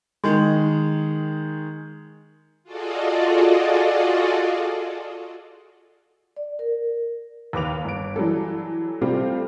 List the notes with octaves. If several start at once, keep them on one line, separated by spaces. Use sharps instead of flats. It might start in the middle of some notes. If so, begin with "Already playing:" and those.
D#3 G#3
F4 F#4 G#4 A4 D5 D#5
D5
A#4
D#2 B4 D6 F7
G1 D7
E3 F#3 G3 A4
C3 G3 A3 C4 F4 G4